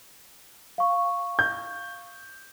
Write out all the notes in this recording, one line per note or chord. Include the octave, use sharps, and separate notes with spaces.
F5 C#6
G6